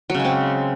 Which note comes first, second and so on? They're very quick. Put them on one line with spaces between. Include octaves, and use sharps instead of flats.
F#3 C#3 G#3 C4